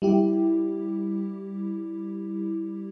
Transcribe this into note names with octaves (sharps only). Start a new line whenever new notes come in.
G3 E4 G4